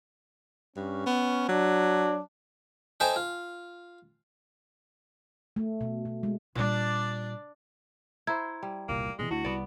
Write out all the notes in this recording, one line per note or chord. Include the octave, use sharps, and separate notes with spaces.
G2 C#4
B3
F#3 D4
D#4 A4 C5 E5 G5 G#5
F4
A3
B2
B2
G#3
A#2 G3 D4 D5
E4 C5 A#5 G#6
G3
E1 C2 A#2 A#3
G2 B2 E3 G#3
D2 E4 F#4
C2 E3 G3 B3 D5